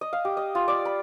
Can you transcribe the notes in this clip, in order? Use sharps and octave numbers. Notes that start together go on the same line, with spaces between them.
D#5
F5
G4
D#5
F4
D5
B5